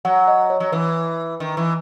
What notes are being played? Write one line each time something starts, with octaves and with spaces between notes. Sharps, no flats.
F#3 F#5
D#5
C#5
F#3
E3 B4
D#3
E3